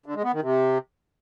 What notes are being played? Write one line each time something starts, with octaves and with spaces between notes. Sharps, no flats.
D3
G#3
B3
D#3
C3